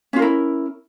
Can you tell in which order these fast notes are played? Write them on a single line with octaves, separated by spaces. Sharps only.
C#4 F4 A#4 E4